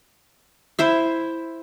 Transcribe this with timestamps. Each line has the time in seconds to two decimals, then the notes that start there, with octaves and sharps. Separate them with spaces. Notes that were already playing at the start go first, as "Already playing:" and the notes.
0.79 E4 C5 E5